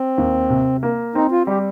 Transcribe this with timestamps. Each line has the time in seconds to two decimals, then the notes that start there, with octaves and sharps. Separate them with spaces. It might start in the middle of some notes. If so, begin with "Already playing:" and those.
Already playing: C4
0.18 D#2
0.50 C3
0.83 A#3
1.15 C4 D#4
1.32 F4
1.47 G3 G4